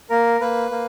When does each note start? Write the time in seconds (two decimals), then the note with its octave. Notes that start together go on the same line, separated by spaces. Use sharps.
0.10 A#3 A#4
0.41 A#3 B4
0.71 A#3